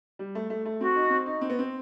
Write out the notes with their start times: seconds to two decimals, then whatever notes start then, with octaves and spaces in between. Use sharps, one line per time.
0.19 G3
0.35 A3
0.50 A3
0.65 A3
0.81 C4 F#4
0.96 D#4
1.10 C4
1.26 D#4
1.41 C4
1.50 B3
1.59 C4